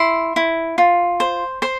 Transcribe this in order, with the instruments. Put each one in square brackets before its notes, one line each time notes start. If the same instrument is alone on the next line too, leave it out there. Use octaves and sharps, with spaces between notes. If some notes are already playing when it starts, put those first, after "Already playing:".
Already playing: [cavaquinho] E4 C6
E4
F4
C5
C5 C6